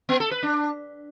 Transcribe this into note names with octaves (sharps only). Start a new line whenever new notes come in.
B3
A4
B4
D4